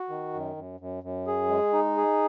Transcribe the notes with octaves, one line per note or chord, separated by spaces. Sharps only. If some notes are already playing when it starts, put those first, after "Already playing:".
Already playing: F#4
D#3
F#2
F#2
F#2
F#2
G#4
G#3
D#4
G#4